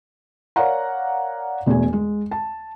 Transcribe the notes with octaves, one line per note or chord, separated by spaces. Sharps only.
A#4 C#5 D5 F5 F#5 A#5
E1 E2 A3 G#4 G#5
G#3
A5